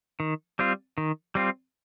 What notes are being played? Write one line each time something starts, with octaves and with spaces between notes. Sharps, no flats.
D#3
G3 C4 F4
D#3
G3 C4 F4